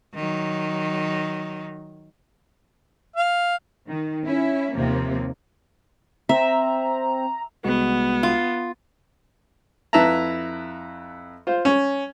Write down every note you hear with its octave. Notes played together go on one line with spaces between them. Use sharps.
D#3 F#3
F5
D#3
C#4 E4
D#2 C3 F3 A#3 C4
C4 E5 A#5
C2 G#3 B3 F#4
F4
F2 E4 B4 E5 A5 A#5
F4 C5
C#4